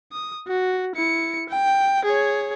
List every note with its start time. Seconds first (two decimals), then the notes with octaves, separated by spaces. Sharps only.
0.12 D#6
0.48 F#4
0.96 E4 C#7
1.49 G5
2.05 G#4 C#5